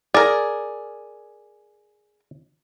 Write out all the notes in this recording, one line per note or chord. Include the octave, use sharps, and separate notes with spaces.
G#4 A#4 D5